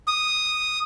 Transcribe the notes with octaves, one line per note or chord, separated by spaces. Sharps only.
D#6